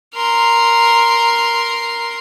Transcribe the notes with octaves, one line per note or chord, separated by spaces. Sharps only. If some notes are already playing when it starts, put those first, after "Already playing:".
A#4 C6